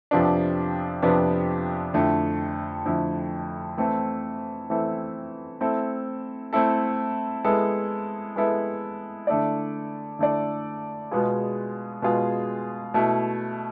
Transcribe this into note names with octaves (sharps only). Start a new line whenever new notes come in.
F2 C3 F3 B3 D4
F2 C3 F3 B3 D4
F2 D3 A3 E4
F2 D3 A3 E4
E3 A3 C4 E4 A4
E3 A3 C4 E4 A4
A3 C4 E4 A4
A3 C4 E4 A4
G#3 B3 E4 A4
G#3 B3 E4 A4
D3 A3 E4 A4 D5
D3 A3 E4 A4 D5
B2 G#3 B3 F4 G#4
B2 G#3 B3 F4 G#4
B2 A3 E4